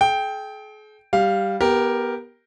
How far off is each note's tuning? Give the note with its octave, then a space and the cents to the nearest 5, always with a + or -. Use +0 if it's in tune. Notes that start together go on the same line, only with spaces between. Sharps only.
G#4 +45 G5 +0
G3 +0 F5 +0
B3 -20 G4 +0 A#4 +0